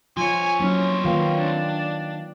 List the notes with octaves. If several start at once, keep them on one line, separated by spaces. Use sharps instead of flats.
F3 C4 F4 C#5 G#5
F#3 A#3 C#4 E4
D#3 A#3 F4 B4 F5 G5
D4